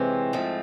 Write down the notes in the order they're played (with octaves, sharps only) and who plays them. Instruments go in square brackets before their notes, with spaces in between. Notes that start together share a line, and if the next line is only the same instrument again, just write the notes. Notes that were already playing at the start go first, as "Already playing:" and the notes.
Already playing: [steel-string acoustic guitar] C3 E3 G#3 C#4 [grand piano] C4
[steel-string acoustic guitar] G#2 F3 A3